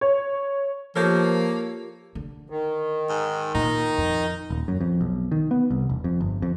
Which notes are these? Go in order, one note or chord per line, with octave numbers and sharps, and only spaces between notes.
C#5
F3 A#3 F4 G4 A4 A#4 C#5
D3
D#3
G#2
A#2 D#4
F2
D#1
F#2
F2
B1
D#3
B3
C2
E1
F2
G1
F2